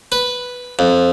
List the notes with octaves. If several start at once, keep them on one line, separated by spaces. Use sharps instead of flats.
B4
F2